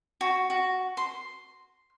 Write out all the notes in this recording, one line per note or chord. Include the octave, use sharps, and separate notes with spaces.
F#4
F#4
C6